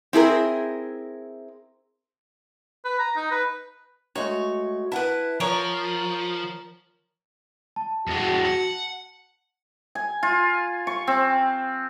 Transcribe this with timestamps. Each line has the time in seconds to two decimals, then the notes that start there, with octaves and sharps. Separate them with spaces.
0.13 C4 E4 G#4 A#4
2.85 B4
2.99 A#5
3.16 D#4
3.31 B4
4.16 G#3 A3 F#4 C#5
4.92 E4 B4 F#5 A5
5.40 F3 A#4 C#5
7.76 A5
8.08 F2 G#3 F#4
8.45 F#5
9.95 G#5
10.23 F4
10.87 C#6
11.07 C4